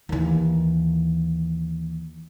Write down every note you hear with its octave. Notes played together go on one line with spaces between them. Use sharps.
D#2 E3